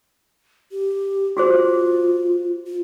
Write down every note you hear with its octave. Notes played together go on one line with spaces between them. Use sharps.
G4
F4 F#4 G#4 C5
F4